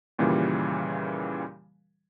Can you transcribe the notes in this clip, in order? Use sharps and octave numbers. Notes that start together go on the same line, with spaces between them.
D#2 A#2 C#3 E3 G3